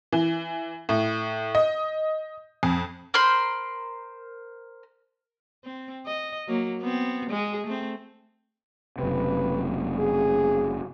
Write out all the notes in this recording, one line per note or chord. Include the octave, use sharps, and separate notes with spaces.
E3
A2
D#5
F2
A#4 C5 B5 C6
C4
D#5
F#3 A#3
B3 C4
G#3 G#4
A3 C4
F#1 C3 B4
G#4